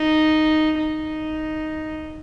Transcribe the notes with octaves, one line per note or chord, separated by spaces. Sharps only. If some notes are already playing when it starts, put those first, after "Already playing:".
Already playing: D#4
D#4